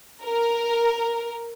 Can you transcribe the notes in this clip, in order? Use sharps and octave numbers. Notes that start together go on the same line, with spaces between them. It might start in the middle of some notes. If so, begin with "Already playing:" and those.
A#4